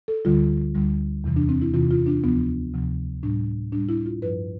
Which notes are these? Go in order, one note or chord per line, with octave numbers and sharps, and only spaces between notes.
A4
D2 D3 G3 F4
D2 D3 G3
E2 C3 E3
D4
C4
E4
E2 C3 E3 F4
F4
D4
D2 C3 F3 B3
D2 C3 F3
A2 G3 D4
A2 G3 D4
E4
F4
G2 F3 B4